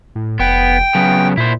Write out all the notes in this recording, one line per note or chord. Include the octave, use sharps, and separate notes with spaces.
A2
F1 B3 G5
C#3 F#3 B3
A#2 E4 C5